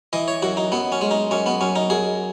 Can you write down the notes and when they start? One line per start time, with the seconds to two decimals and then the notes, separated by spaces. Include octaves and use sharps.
0.13 E3 D#5
0.28 C#5
0.42 F#2 F#4
0.57 D#4
0.72 F#2 B3
0.92 C#4
1.01 G#3
1.11 D#4
1.31 F#2 C#4
1.46 B3
1.61 F#2 C#4
1.76 D#4
1.90 F#2 G#4